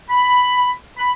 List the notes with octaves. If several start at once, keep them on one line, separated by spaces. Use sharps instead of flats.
B5
B5